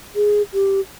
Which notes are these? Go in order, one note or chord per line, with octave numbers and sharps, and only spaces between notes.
G#4
G4